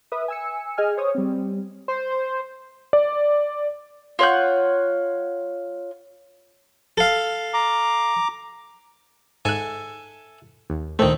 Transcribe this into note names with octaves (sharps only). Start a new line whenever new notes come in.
B4 E5 D#6
G#5 E6 C#7
G#4 D#5 G#5 F6
C5 C#5 D#6
G3 C4
C5
D5
F4 C#5 F#5 G6
A4 F5
A#5 D6
G#2 A4 E5 G#5 F#6
D#2
D2 A#2 D#3 A3 C4